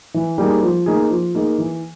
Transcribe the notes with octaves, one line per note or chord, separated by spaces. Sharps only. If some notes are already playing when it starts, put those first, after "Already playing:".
E3
G3 A#3 D#4 G#4
F3
A#3 D#4 G#4
F3
A#3 D#4 G#4
E3